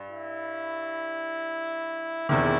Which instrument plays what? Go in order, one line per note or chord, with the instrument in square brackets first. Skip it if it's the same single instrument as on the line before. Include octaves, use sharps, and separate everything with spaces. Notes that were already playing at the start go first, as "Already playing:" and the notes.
Already playing: [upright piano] G2
[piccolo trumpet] E4
[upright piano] E1 E2 C3 D#3 [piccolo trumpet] E4